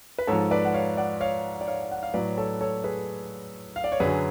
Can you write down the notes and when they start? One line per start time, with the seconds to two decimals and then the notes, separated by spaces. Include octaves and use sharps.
0.19 B4
0.27 G#2 F3 A4 C#5
0.51 B4 D5
0.65 F#5
0.74 C#5 F5
0.97 D5 F#5
1.21 C#5 F5
1.61 D5
1.67 C#5 F5
1.91 F#5
2.03 F5
2.14 A2 F#3 B4 D5
2.37 A4 C#5
2.61 A4 C#5
2.84 G#4 B4
3.76 F5
3.84 D5
3.92 C#5
4.00 F#2 D3 F#3 G#4 B4